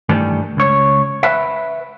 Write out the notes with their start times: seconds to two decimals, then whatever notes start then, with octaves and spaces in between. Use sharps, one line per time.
0.09 G2 D#3 E3 G3 A3
0.57 C#2 C#5
1.23 B4 E5